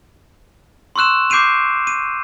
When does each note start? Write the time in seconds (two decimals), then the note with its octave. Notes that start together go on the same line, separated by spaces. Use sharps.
0.96 C6 C#6 E6 F#6 E7
1.30 D6 G6 C7 D7 D#7 F7
1.87 D#7